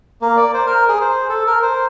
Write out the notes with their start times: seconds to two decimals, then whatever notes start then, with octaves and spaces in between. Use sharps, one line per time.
0.21 A#3
0.37 D5
0.54 C5
0.66 A#4
0.88 G#4
1.01 C5
1.29 A4
1.47 A#4
1.62 C5